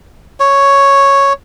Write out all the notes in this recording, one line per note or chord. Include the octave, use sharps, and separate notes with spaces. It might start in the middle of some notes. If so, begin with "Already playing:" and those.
C#5